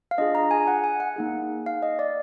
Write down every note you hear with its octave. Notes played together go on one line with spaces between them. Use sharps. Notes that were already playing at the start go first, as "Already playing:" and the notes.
F5
D4 F4 G#4 D#5
A#5
G#5
F#5
G#5
F#5
A#3 D#4 G#4
F5
D#5
D5